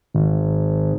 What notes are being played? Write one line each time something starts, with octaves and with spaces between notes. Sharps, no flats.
G#1